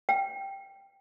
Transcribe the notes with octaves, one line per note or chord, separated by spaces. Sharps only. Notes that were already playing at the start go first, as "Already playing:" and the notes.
G5